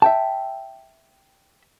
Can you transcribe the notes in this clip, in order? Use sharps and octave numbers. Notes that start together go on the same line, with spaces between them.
E5 G5 A5